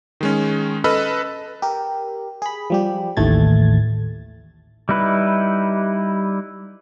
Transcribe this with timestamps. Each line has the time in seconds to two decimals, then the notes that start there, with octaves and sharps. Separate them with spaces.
0.21 D#3 G#3 C#4
0.84 A4 B4 D#5 B5 E6 F6
1.62 G4 A#4
2.42 G#4 B5
2.70 F3 G3 G4
3.17 A1 D#2 A2 A3 G#6 A6
4.89 G3 D#4 E4 B4